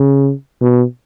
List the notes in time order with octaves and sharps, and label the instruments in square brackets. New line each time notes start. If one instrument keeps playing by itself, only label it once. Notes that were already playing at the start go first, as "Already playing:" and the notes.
Already playing: [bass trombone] C#3
B2